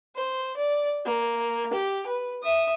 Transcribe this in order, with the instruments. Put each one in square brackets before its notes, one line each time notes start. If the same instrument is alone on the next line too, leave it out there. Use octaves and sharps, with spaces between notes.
[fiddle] C5
D5
A#3
G4
B4
E5 D#6